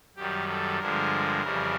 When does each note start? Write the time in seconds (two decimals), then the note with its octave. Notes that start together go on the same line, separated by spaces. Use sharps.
0.16 F#2 D#3 G3 G4
0.48 A4
0.79 G2 D3 F3 G#3 A#4
1.41 F2 C#3 E3 G3